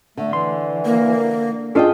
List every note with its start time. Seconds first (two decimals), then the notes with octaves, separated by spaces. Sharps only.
0.17 D3 A3
0.33 E3 C6
0.85 A#3
1.75 C#4 D4 F4 G#4 A4 D#5 G5